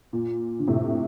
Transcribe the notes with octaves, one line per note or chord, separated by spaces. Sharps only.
A#2
D3
A2 C3